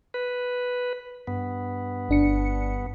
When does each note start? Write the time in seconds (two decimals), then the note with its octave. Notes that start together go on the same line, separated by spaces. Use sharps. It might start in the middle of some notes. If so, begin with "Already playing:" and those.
0.14 B4
1.27 G2 B3
2.09 G1 D4 C#7